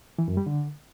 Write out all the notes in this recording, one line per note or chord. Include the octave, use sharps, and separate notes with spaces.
E3
F#2
G3
D3